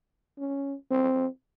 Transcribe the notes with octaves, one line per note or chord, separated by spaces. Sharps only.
C#4
C4